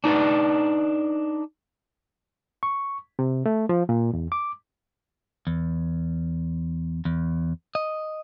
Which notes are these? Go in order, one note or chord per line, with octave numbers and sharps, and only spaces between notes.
D4 D#4 B4 D5
C#6
C3
A3
F3
A#2
E2
D6
E2
E2
D#5